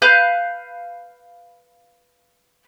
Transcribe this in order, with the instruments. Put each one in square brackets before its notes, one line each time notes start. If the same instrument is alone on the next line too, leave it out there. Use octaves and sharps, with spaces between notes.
[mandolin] B4 F5 F#6 G6